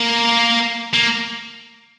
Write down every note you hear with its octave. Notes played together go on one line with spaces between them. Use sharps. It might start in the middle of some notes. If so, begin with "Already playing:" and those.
Already playing: A#3
A#3